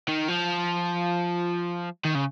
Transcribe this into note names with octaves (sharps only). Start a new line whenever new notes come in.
D#3
F3
D#3
C#3